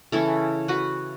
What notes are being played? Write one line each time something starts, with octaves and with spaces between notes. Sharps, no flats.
C#3 E3 C#4 E4 A4
F#4 B4